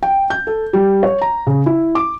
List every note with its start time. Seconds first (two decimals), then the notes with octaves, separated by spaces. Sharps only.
0.03 G5
0.30 G6
0.47 A4
0.73 G3
1.03 C#5
1.21 A#5
1.47 C#3
1.66 E4
1.95 D6